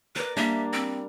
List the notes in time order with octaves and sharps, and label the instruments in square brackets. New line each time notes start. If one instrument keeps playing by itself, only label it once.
[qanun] A#4 D5 [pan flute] B4
[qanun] G3 A#3 D4 [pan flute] E5
[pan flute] C4